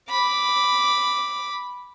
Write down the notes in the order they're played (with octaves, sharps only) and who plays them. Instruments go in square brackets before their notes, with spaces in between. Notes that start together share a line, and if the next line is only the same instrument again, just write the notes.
[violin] B5 D6